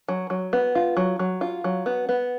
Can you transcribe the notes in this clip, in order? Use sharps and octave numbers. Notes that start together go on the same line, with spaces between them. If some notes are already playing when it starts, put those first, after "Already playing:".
F#3
F#3
B3
F4
F#3
F#3
F4
F#3
B3
B3